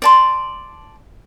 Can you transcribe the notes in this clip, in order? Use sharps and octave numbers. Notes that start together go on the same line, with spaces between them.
D5 A5 C6